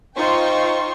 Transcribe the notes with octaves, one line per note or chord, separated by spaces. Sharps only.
D#4 F4 C5 G5 C6 C#6